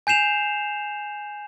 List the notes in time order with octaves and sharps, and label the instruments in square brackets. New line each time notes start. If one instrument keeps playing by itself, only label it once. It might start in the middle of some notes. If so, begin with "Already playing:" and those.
[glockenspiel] G#5 G6 C7 E7 F7